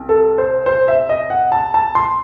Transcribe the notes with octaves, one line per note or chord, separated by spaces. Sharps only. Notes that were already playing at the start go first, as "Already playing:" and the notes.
Already playing: C2
A4
C5
C5
E5
D#5
F#5
A5
A5
C6